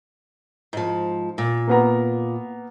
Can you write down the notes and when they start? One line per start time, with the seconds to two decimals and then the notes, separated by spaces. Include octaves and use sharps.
0.73 G#2 F3
1.38 A#2
1.68 A#3 B3 A#5